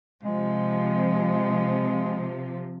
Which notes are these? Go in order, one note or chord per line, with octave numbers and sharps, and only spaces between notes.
C3 F3 G#3